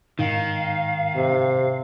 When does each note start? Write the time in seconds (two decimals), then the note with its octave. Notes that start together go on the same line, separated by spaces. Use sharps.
0.19 G#2 D#3 D#4 F5
1.16 C3